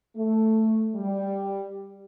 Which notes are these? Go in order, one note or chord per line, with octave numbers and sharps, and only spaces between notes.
A3
G3